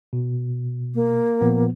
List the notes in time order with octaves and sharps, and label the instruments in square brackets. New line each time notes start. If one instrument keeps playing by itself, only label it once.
[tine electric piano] B2
[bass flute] A#3
[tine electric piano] A#2 F3 B3